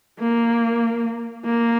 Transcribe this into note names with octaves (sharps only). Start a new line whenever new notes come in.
A#3
A#3